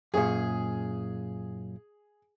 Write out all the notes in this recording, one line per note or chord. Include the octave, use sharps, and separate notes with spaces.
F#2 A#2 G#4